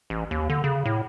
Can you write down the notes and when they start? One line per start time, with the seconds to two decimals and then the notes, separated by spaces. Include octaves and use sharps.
0.10 A1
0.31 D#2
0.50 D3
0.64 C#3
0.85 A2